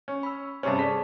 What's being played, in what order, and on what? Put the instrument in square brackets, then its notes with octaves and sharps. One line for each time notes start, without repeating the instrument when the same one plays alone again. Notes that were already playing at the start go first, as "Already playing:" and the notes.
[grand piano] C#4
[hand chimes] B5 E6
[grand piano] G2 C3 C#4 [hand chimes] C5 A5
[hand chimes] G#4 A4 D5 [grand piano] B6